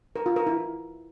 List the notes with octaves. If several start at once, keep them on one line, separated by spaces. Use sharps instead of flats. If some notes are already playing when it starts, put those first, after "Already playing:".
A#4
F4
A#4
E4